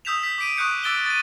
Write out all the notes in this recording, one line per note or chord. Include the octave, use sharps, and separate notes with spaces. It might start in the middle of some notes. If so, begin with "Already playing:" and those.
D#6 E6 G6 B6 E7 F7
B6
D6 B6 D7 D#7
C#6 D#6 F#6 G6 C#7
D6 E6 A6 D7 G7
A6 D#7